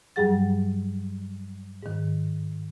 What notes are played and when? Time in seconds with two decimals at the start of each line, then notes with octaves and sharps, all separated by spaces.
0.16 G2 F#3 G3 G#4 F#5 A6
1.82 G#2 D#3